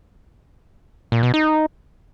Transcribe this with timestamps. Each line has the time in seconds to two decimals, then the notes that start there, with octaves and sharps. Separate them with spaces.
1.12 A#2
1.23 B2
1.34 D#4